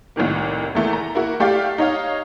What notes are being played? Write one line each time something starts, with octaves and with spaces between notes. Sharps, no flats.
C2 A2 D#3 A#3
E2 E3 A3 A#3
A#5
A#3 E4 F#4
A3 G4 D5 F5
D#4 C#5 F5